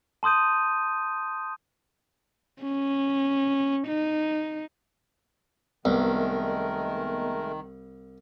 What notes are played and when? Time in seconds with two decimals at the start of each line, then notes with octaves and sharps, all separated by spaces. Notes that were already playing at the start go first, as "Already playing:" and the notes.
0.23 A5 C6 D#6 G6 D#7
2.62 C#4
3.87 D#4
5.85 C2 D#3 G#3 A3 B3 A#4